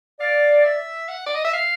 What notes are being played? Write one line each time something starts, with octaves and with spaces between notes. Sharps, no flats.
D5 F5
E5
F#5
D5
D#5
E5
F5